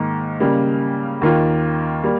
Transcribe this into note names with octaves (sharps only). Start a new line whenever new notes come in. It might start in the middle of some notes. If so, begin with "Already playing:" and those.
Already playing: G#2 D#3 A#3
C#3 G3 A#3
D#2 D#3 A#3 F4
G3 A#3